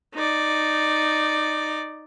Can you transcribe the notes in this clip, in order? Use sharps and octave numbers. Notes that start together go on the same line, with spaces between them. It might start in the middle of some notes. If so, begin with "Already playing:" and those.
D#4 D5